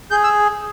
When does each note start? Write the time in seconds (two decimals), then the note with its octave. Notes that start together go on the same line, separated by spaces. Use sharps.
0.11 G#4 G6
0.24 E6